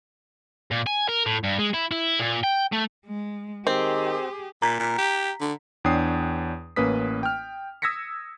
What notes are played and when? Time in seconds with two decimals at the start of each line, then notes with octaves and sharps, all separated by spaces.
0.71 A#2
0.87 G#5
1.09 A#4
1.26 A2
1.44 G2
1.59 G#3
1.74 E4
1.91 E4
2.20 A#2
2.44 G5
2.73 A3
3.06 G#3
3.67 D#3 C4 G4 G#4 A#4
4.62 A#2 A#5 B6
4.80 A#2
4.98 G4
5.41 D3
5.84 E2 D4 C#5 G5 D#6 C7
6.76 A1 A#3 C#4 B4 D#6 B6
7.23 G5 F6
7.82 D#6 E6 G#6 A#6 B6 C#7